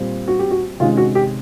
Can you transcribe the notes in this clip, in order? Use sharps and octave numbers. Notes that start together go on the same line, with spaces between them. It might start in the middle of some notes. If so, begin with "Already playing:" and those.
Already playing: A#2 G3 C4
F#4
G4
F#4
C3 D#3 G#3 C#4 F4
F#4
G4